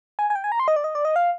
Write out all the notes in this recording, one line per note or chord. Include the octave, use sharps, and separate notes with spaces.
G#5
G#5
G5
G#5
A#5
C6
D#5
D5
D#5
D5
D#5
F5